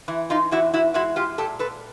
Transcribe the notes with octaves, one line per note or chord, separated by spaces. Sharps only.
E3 E4
D#4 F4
E2 E4 F#4
E4 F#4
G#3 E4 F#4
F4 G4
A#2 G4 A4
A4 B4